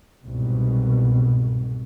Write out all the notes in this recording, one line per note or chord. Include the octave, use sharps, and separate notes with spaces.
C2 G#2 B2